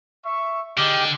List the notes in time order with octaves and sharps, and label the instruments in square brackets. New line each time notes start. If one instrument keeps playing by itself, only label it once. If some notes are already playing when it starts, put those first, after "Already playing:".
[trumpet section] E5 C#6
[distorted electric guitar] D3 [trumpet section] D#4 G#4 D#5 [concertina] G4 G5 F6